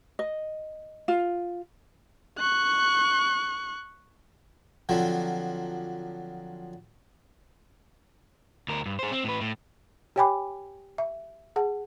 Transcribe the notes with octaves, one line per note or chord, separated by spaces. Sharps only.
D#5
F4
C#6 F#6
D3 F3 F#3 C4
D2 A#4
G2
G#4 C5
C4
A2 B4
A2
G4 C#5 G5 G#5 B5 D6
E5
G#4 F#5 A5